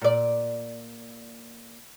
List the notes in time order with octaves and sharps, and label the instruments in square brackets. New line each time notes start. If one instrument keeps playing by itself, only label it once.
[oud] A#2 D5